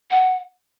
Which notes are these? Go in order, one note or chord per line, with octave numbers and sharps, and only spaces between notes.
F#5